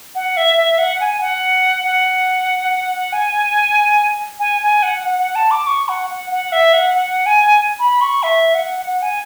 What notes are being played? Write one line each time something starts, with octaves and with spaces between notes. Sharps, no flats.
F#5
E5
E5
F#5
G#5
F#5
F#5
G#5
G#5
G#5
F#5
F#5
F#5
A5
D6
C#6
F#5
F#5
F#5
E5
F#5
F#5
G#5
B5
C#6
E5
F#5
F#5
G#5